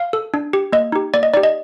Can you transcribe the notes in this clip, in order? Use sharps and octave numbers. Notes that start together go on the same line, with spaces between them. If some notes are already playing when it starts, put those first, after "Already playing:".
Already playing: F5
A4
D4
G4
A#3 D#5
D#4 G4
A#3 D5
D#5
D#4 G4 D5
D#5